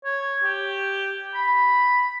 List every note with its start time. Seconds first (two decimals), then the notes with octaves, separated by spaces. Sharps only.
0.05 C#5
0.44 G4
1.35 B5